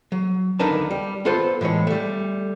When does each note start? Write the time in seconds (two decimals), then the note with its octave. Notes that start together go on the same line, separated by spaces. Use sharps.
0.12 F#3
0.59 D#2 D3 D#4 A#4 B4 A5
0.91 G3
1.25 B3 F4 A4 B4 C5
1.61 A2 E3 G#3 C#5
1.87 G3 A3